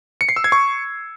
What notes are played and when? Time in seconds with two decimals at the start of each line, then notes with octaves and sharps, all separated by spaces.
0.21 C#7
0.29 C7
0.36 E6
0.44 G#6
0.52 C#6